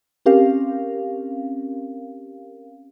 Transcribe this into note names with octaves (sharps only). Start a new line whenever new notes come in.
C4 C#4 G4 A#4 F5